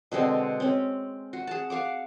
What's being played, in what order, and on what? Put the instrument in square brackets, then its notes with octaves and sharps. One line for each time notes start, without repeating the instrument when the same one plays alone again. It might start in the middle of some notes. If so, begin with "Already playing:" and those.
[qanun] B2 D3 G#3 C4
C4 C#4
F#4
G#4 A5
F5 F#5 D6